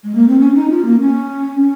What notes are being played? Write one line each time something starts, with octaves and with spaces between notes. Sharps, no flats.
G#3
A#3
C4
C#4
D#4
F4
A#3
C#4
C#4